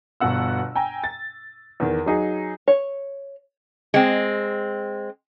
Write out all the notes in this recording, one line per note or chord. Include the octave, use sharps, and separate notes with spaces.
G1 B2 F#5 E6
G5 G#5 A#5
A6
E2 D#3
F#3 D#4 G#4
C#5
G#3 C4